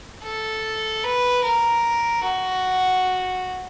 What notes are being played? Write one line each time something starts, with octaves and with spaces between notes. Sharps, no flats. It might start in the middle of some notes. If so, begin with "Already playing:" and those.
A4
B4
A#4
F#4